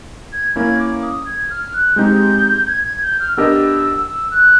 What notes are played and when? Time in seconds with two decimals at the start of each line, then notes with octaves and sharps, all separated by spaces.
0.33 G#6
0.56 A#3 C#4 E4 G#6
0.79 D6
1.02 D#6
1.26 G#6
1.50 F6
1.73 F#6
1.96 G#3 C4 D#4 G4 G6
2.67 G#6
2.84 G#6
3.02 G6
3.20 F6
3.36 B3 D4 G4 A#4 D#5 E6
4.07 E6
4.31 F#6